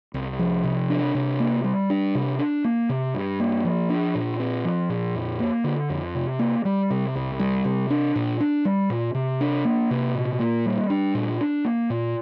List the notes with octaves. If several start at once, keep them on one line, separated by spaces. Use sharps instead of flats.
C2
F3
C3
D4
C3
A#3
G3
D4
C3
D4
A#3
C3
G2
A#3
F3
D4
A#2
C4
F3
A#2
F2
A#3
D3
F2
C3
A#3
G3
C3
C2
G3
C3
D4
A#2
D4
G3
A#2
C3
D4
A#3
C3
A#2
A#3
G3
D4
A#2
D4
A#3
A#2